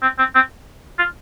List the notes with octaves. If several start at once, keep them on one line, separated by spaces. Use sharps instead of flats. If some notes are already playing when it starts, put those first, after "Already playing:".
C4
C4
C4
F4